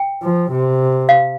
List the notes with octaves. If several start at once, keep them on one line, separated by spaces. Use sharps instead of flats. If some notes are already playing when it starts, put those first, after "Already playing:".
Already playing: G5
F3
C3
F5